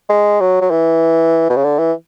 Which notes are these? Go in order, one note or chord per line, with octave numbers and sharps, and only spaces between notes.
G#3
F#3
F#3
E3
B2
C#3
D3
E3